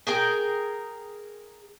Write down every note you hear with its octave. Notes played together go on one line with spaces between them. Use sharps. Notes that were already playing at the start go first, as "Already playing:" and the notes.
G#4 A#4 G5